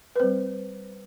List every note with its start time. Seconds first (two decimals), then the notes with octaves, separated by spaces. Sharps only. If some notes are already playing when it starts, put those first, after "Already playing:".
0.16 B4
0.20 G3 C4 C5